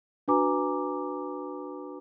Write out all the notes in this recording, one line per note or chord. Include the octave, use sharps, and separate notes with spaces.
D4 F#4 B4 G#5 A#5 D6